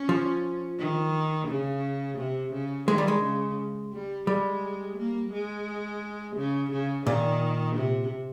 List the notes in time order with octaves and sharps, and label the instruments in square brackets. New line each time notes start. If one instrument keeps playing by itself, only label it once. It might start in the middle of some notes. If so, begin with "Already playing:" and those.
Already playing: [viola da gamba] C#4
[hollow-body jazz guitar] F3
[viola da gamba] D#3
C#3
C3
C#3
[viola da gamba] D#3 [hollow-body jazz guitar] G#3
[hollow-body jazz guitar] G3
G#3
[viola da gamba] C#3
G3
[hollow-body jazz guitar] G3 [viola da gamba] G#3
[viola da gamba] A#3
G#3
C#3
C#3
[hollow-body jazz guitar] A#2 [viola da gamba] D#3
[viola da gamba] C3